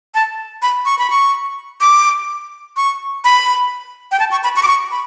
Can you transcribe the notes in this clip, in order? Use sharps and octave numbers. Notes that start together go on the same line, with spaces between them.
A5
B5
C#6
B5
C#6
D6
C#6
B5
G5
A5
C#6
B5
C#6
D6
C#6
B5